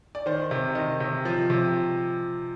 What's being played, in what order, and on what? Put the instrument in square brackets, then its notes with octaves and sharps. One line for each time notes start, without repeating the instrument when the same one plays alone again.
[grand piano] D5
D#3 C5
C3
D#3 D#5
C3
F3
C3